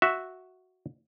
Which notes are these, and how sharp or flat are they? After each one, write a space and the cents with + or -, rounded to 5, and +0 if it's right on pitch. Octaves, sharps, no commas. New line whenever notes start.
F#4 +0 E5 -5